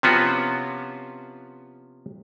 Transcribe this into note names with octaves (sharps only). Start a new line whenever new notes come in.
C3 F3 B3 C#4 F4 F#4